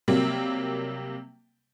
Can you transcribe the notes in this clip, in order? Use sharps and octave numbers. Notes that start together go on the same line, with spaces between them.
C3 F#3 G3 A#3 C4